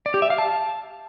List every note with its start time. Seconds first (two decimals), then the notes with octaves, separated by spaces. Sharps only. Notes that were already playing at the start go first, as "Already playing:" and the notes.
0.06 D5
0.14 G4
0.22 E5
0.30 F5
0.38 A5